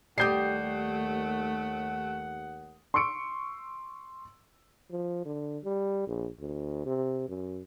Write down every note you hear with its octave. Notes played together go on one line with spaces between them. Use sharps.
D#2 G3 A3 G4 F#5 D#6 G6 C7
C6 C#6 E6 C#7 D7
F3
D3
G3
A#1
D2
C3
F#2